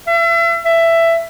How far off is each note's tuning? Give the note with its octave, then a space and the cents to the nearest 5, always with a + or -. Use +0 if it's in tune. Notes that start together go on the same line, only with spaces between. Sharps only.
E5 +40
E5 +15